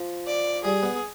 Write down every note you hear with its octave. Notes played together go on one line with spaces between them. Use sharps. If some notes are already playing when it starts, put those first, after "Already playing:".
Already playing: F3
D5
G3 G#4
B3